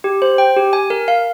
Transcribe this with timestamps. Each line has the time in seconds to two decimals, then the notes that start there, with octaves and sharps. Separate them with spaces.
0.04 G4
0.22 C5
0.38 G5
0.56 G4
0.73 G#5
0.90 A#4
1.08 F5